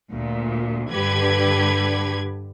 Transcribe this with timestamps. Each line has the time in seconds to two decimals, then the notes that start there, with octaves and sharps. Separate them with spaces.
0.10 D2 A#2
0.91 G2 D3 G4 B4 G#6